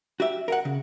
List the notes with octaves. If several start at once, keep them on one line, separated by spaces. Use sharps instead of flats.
F#4 G4 E5
A#4 F5 F#5
C#3